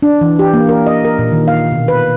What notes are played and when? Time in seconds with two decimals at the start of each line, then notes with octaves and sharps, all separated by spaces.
0.02 D4
0.21 E3
0.39 G4
0.54 A#3
0.69 A#4
0.86 D#5
1.05 A#4
1.19 A#2
1.32 D#3
1.48 F5
1.72 B2
1.88 B4